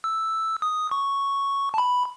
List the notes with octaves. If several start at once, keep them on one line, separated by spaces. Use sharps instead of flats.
E6
D#6
C#6
A5
B5